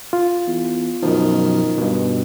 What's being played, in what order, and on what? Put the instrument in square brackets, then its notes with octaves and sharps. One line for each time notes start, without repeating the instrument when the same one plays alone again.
[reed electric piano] F4
[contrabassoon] E2
[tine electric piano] F#2 B2 F3 [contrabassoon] D#3
[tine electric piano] G2 B2